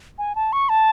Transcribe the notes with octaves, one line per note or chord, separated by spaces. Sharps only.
G#5
A5
C#6
A5